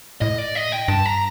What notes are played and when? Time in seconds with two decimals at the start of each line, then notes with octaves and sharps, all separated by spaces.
0.21 A2 D#5
0.38 D5
0.55 D#5
0.72 G5
0.88 G2 A5
1.06 A#5